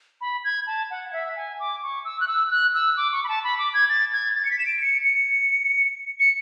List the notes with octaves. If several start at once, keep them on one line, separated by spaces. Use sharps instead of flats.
B5
G#6
A5
F#5
F#5
E5
G#5
D6
C#6
E6
F#6
E6
F#6
E6
D6
C#6
B5
A5
B5
D6
G#6
A6
G#6
A6
C#7
B6
E7
D7
C#7
C#7
C#7